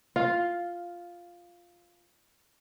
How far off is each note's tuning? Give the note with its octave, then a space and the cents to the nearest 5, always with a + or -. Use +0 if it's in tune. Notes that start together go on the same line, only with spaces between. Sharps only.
F4 +0 F5 +10